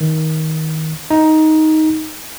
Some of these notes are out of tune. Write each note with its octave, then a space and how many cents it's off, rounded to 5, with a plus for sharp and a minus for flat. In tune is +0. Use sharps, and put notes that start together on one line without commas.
D#3 +20
D#4 +10